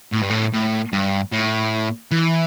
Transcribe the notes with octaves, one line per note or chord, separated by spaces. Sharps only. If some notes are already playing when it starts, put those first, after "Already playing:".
A2
G2
A2
A2
G2
A2
E3